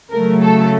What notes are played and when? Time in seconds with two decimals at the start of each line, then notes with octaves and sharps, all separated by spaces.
0.10 C#3 F#3 A3 A#4
0.42 A4